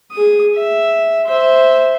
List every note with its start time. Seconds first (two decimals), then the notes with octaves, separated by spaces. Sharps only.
0.12 G#4 D#6
0.55 E5
1.27 C5 E5